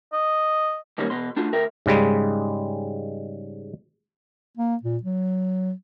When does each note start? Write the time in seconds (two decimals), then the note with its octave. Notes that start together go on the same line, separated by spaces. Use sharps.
0.13 D#5
0.98 F#2 D#3 G3 A#3 C#4
1.10 E2 B2 C6
1.36 A3 D4 F4 F#4
1.53 D2 A#4 E5 G5
1.86 G#2 C#3 G3 G#3
4.57 A#3
4.83 A#2
5.03 F#3